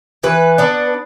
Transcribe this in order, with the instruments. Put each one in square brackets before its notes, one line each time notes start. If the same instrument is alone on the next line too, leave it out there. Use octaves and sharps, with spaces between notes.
[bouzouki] E3 B4
B3 D4